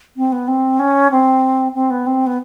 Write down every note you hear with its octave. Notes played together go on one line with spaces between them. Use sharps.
C4
B3
C4
C#4
C4
C4
B3
C4
B3